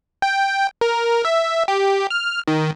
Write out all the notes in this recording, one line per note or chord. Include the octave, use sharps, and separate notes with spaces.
G5
A#4
E5
G4
F6
D#3